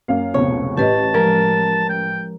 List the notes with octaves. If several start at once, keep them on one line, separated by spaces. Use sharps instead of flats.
F#2 A#3 F5
F1 C#2 B2 C#5
A1 G4 B4 D#5 A5
F3 G#3 A#4
G5